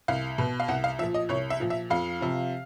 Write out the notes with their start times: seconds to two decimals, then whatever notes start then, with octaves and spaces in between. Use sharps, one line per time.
0.08 C2 F5
0.38 B2
0.60 F5
0.68 C2 F#5
0.84 F5
0.99 F3 E5
1.03 A#2
1.14 D#5
1.29 C2 C#5
1.50 E5
1.60 A#2 F3
1.70 E5
1.90 F2 F5
2.21 C3 F3